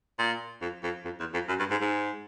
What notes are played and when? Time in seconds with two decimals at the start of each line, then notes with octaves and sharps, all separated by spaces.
0.19 A#2
0.61 F2
0.83 F2
1.05 F2
1.20 E2
1.34 F2
1.48 F#2
1.59 G2
1.71 G#2
1.81 G#2